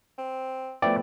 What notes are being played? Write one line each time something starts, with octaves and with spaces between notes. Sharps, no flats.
C4
F3 A3 B3 E4 D5 G5